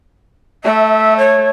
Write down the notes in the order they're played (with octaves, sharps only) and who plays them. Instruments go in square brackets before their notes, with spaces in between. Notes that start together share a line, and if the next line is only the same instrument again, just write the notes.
[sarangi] A3 [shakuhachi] E5
[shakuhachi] C#5